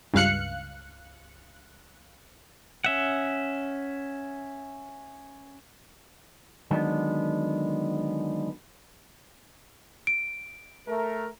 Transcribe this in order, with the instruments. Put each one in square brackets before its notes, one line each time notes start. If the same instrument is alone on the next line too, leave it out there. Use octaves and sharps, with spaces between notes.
[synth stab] C#2 G2 F5 F#6 C#7
[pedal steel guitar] C#4 E5 F#5
[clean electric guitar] D3 D#3 F#3 G#3 B3 D4
[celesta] D7
[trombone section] A3 A#4